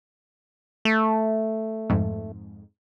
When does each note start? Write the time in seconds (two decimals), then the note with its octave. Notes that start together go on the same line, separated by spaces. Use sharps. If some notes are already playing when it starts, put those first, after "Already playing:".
0.85 A3
1.90 F2 G#2